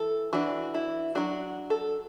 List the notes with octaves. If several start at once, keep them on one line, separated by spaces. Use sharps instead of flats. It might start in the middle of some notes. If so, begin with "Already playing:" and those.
Already playing: E3 A4
E3 D4 F#4
E4
F#3 D4 F#4
A4